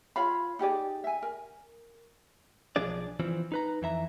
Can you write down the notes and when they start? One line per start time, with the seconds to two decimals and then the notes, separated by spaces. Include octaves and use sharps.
0.16 F4 C#5 F5 B5
0.59 D#4 G4 G#4 D5
1.04 E5 G#5
1.22 A#4
2.76 B1 F3 D4 G#4 D5
3.20 E3 F3 C4
3.52 D#4 B4 A#5
3.82 F2 E3 E5 A#5